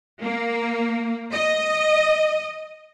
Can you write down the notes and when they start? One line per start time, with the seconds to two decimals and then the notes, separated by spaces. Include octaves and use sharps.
0.20 A#3
1.32 D#5